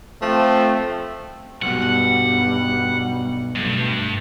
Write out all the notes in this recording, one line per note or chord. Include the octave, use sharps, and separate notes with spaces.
F3 A3 C4
B1 G2 B2 G3 F#5
G2 B2 A3